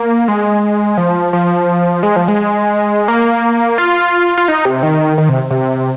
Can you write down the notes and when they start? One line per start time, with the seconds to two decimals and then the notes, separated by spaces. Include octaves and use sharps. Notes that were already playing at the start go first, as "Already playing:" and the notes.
Already playing: A#3
0.28 G#3
0.97 F3
1.33 F3
2.03 G#3
2.16 F3
2.28 G#3
3.08 A#3
3.78 F4
4.38 F4
4.48 D#4
4.65 C3
4.83 D#3
5.18 D#3
5.29 C3
5.51 C3